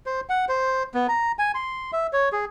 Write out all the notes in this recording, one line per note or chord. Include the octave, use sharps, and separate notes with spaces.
C5
F#5
C5
B3
A#5
G#5
C6
E5
C#5
G#4